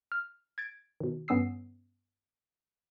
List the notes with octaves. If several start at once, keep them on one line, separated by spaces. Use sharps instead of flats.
F6
G#6 A6 D7
B2 D#3
G2 B3 C#4 D#6 E6 C7